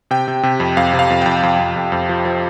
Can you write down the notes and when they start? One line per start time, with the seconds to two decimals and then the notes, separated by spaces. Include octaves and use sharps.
0.11 C3 G5
0.28 C3
0.43 C3
0.60 F2
0.77 F2 F5
0.93 C3
0.99 F5
1.10 F2
1.21 F2 G5
1.43 F2
1.59 F2
1.76 F2
1.92 F2
2.09 F3
2.25 F3